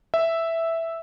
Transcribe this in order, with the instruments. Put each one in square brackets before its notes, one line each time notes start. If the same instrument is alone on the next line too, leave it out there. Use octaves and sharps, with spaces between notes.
[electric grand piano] E5